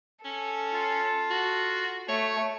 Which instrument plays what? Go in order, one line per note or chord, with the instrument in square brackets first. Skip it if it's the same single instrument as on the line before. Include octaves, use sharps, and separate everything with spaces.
[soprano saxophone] C#4 [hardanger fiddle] A4
[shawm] F4
[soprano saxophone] F#4
[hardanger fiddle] A3 [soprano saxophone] C#5